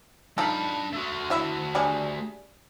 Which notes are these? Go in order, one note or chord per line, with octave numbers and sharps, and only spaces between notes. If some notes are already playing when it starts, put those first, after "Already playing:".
D4 D#4 F4 A4 B5
A3 F#4
E4 E5
G3 D4 G#4